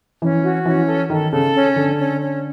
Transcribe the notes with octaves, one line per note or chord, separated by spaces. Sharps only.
E3 C#4
F#4
E3 C#4
A4
D#3 A4
C#3 A4
C#4
D3 A4
C#4
C#4